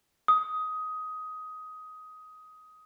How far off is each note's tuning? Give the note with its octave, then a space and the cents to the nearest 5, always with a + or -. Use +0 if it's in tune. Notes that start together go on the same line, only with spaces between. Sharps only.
D#6 +15